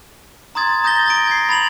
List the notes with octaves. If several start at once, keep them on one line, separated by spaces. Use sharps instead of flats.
A#5 C6 D#6 G#6 A6
A#5 D#6 G6 A6 A#6 G7
A6 A#6 D7
G#6 A#6 C7
B5 A6 F7 F#7